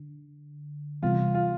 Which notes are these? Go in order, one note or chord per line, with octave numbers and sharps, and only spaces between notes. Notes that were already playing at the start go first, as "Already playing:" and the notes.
Already playing: D3
C3 E3 G3 B3 F4
F4